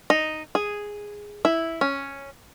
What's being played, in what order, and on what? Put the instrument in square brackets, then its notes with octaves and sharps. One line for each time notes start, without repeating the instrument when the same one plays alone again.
[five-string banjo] D#4
G#4
E4
C#4